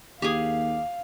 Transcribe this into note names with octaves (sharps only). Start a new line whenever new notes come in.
D#2 G4 G#4 F5